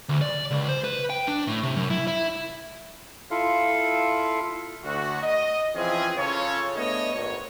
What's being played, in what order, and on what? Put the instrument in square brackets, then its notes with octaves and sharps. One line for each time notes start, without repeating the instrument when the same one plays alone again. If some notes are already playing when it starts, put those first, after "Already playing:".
[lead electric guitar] D2
D5
C#2
C5
B4
G5
D4
A2
C3
F#2
E4
E4
[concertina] E4 F4 A4 F5
[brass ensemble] D2 F#4
D#5
E3 F3 C4 C#4 G#4
C#3 C#4 F4 A4 C#5
A3 B3 D4 C#5 D#5
G#1 C#5